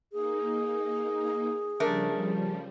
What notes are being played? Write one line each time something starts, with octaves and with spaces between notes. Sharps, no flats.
A#3 D#4 G#4
C#3 F3 G3 A3 D4 A#4